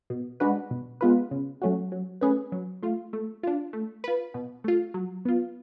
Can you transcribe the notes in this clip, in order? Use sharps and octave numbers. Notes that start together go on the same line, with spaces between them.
B2
G#3 D4 F#4 B4
B2
G#3 B3 F4 B4
C#3
F#3 A3 C#4 F#4
F#3
A3 C#4 G#4 B4
F#3
A3 F4
A3
D4 F4
A3
F4 B4
B2
A3 F4
F#3
B3 F4